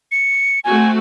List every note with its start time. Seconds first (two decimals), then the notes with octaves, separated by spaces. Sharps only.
0.12 C#7
0.64 A3 C4 F#4 G#5